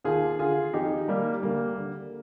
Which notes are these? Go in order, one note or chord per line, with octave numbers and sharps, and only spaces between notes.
D#2 F4 G#4
D3 F4 G#4
F2 D#4 G4
D#3 G3 A#3
D2 G3 A#3
D3